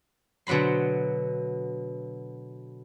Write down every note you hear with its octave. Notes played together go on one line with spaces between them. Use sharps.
B2 D3 F#3 B5 C6